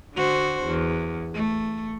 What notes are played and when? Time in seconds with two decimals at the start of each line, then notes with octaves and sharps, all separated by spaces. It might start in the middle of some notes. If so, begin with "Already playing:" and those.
0.14 D3 F#4 C5
0.64 E2
1.34 A3